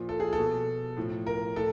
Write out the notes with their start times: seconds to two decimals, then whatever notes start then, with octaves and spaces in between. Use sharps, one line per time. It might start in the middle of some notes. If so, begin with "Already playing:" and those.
Already playing: A#2 F3
0.09 A4
0.20 G#4
0.33 A4
0.38 B2
0.97 A2 F3
1.26 A#4
1.56 A2 A4